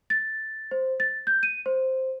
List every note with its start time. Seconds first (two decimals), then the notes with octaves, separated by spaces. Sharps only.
0.10 A6
0.71 C5
1.00 A6
1.27 G6
1.43 D#7
1.66 C5